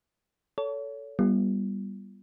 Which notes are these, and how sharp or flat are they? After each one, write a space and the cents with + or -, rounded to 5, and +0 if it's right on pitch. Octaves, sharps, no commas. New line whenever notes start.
A4 +0 C#5 +30
G3 +0 B3 -30 F4 -30